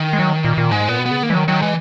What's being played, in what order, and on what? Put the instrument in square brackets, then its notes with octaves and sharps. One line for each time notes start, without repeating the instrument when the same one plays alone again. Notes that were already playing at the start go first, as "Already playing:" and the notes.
Already playing: [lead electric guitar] D#3
[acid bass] G#3
F#3
A#2
A#2
[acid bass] G#2 [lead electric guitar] G#3
[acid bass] A#2 [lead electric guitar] B3
[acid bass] B2
[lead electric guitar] B3
[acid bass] C#3
[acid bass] D#3 [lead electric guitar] A#3
[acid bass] E3
[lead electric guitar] D#3 [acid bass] F#3
[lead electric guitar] D#3 [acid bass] F#3
[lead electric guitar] E3 [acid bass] G#3